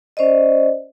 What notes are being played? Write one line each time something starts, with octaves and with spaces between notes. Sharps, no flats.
C#4 C5 D5 D#5